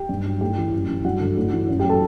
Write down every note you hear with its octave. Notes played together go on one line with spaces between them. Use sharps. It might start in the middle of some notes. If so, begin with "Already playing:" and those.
Already playing: G4 G5
G2
F#3
A2 G4 G5
E3
F#2
E3
G2 F#4 F#5
D3 F#3
A2
E3
F#2
G4 G5
F#3
A4 A5